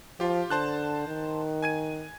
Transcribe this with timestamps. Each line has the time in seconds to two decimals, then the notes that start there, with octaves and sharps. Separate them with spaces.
0.20 F3 F4 G4
0.50 D3 C5 A5 F#6
1.07 D#3
1.63 G#5 G#6 D#7